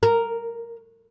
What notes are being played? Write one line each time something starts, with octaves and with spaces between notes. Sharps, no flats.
A#4